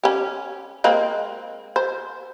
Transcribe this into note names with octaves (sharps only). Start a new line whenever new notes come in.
C#4 G4
G#3 A#3 C4
C5